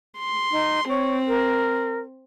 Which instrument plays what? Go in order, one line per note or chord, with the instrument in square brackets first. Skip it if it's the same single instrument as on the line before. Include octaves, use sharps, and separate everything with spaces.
[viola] C6
[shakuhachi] D#4
[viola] C4 [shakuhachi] C#5
[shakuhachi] A#4